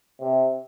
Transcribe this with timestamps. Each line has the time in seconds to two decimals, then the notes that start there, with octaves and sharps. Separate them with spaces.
0.21 C3